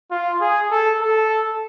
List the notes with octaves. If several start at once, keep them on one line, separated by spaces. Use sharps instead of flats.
F4
G#4
A4
A4